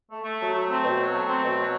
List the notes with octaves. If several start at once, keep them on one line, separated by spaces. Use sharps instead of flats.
A3
A3
F#3
A3
C4
B2
F#3
A3
C4
B2
F#3